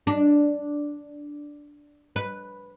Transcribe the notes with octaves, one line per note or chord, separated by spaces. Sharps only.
D4
B4